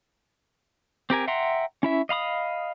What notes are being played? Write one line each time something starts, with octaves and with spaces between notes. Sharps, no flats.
C4 G4 A#4 G#5
E5 F#5 G5 A#5 C6
C#4 E4 E5
D#5 F5 B5 D#6